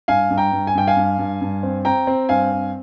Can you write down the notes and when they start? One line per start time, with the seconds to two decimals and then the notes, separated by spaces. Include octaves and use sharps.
0.08 G2 F5 G#5
0.30 G2
0.38 G5 A#5
0.53 G2
0.67 G#5
0.75 G2 G5
0.87 F5 G#5
0.97 G2
1.19 G2
1.41 G2
1.63 C4
1.85 C4 G5 A#5
2.07 C4
2.29 G2 F5 G#5
2.52 C4